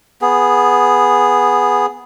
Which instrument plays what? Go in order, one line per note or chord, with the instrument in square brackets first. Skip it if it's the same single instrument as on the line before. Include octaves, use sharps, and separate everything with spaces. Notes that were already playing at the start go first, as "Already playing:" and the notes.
[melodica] B3 G#4